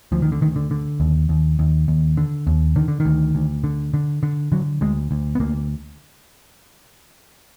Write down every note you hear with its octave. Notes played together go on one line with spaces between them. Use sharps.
D2 F3
D#3
D3
D2 D#3
D3
D3
D#2
D#2
D#2
D#2
D3
D#2
D3 D#3
D3
D#3
D2
D2
D3
D3
D3
D3 F#3
D2 G#3
D2
B3
D2 A#3